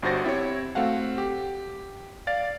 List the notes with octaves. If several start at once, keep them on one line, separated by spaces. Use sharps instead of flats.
G1 G2 F#4 C5 A6 A#6
C4 E4 G4 C#5
A3 C4 F#4 F5 F#5
G4
D5 F5 A6